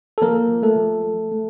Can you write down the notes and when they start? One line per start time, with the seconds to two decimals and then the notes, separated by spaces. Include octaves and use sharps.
0.18 A4
0.22 F3 A#3 A#4
0.50 F3
0.63 A3 A4
0.76 F3
1.04 A3
1.32 A3